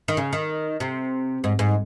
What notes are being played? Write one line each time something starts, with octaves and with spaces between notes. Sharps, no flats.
D#3
C#3
D#3
C3
G#2
G#2